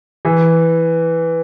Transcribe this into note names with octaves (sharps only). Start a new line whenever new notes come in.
E3